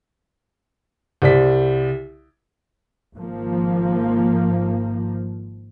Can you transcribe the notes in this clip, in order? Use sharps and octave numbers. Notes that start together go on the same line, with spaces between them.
C2 C5 D5 B6
G#1 F3 A#3